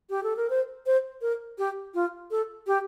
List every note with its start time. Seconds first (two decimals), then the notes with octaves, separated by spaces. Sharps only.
0.10 G4
0.23 A4
0.37 A#4
0.50 C5
0.86 C5
1.22 A#4
1.58 G4
1.94 F4
2.31 A4
2.67 G4